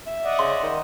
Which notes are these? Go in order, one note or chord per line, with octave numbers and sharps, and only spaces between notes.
E5
D5 D#5 F#5
C#3 C6
D#3